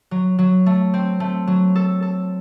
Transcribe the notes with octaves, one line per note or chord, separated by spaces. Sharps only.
F#3
F#3
A3
C4
A3
F#3
A4
A4